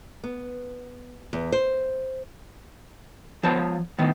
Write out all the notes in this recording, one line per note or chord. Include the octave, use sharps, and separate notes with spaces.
B3
E2
C5
F3 B3 C5 C#5 A5
A2 D#3 B3